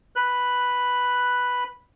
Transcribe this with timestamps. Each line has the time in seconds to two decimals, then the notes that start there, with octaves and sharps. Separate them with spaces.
0.16 B4 F#6